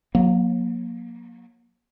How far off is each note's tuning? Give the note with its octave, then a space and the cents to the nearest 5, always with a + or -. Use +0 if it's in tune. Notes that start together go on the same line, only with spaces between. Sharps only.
F#3 -35 A#3 +20